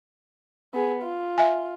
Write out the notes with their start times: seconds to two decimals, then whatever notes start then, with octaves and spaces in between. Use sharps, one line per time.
0.74 B3 G#4
1.03 F4
1.38 E5 G#5